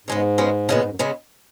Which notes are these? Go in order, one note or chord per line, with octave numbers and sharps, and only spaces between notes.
G#2 C#3 G#3 B3
C#3 G#3 B3
A#2 C#3 G#3 B3
G#2
F#2
C#3 G#3 B3